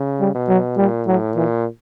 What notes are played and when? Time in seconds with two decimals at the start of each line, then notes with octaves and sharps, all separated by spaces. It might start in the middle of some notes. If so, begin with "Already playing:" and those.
Already playing: C#3
0.20 G3
0.35 B2
0.49 F#3
0.77 A#2 G3
1.06 A2 F#3
1.35 A#2 E3